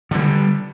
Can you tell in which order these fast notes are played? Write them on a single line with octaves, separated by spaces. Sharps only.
D3 E3 G3